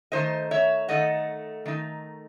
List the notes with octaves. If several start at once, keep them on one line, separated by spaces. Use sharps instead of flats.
D#3 A3 D#4 C5 D#5
C#5 E5
D#3 A3 D#4 D#5 F#5
D#3 A3 D#4